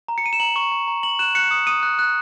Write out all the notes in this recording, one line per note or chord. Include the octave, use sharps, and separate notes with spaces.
A#5
C#7
A#5 D#7
E7
A#5 F#7
C#6
A#5
A#5
A#5 F#7
F#6 E7
F#6 C#7
D#6 C#7
D#6 D#7
F#6
F#6